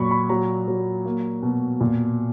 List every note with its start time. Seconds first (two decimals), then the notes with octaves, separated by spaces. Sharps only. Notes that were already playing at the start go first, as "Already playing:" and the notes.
Already playing: A#2 F#3 B5 C#6
0.11 B5
0.29 F#3 A#5
0.68 F#3
1.05 A#3
1.43 B2
1.81 A#2